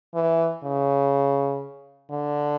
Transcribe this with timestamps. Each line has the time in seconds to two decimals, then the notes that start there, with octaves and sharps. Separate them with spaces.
0.15 E3
0.63 C#3
2.11 D3